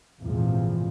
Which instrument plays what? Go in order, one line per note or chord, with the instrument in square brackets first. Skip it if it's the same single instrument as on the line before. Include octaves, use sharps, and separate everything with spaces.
[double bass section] A#1 E2 G#2 C3 F3 G#3